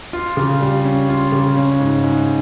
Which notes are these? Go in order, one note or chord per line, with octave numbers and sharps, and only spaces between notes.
F4
C#3
G3
C#4
F4
C#3
C#4
G#2
G#2